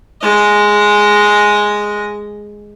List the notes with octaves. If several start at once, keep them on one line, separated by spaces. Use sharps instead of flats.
G#3 D#5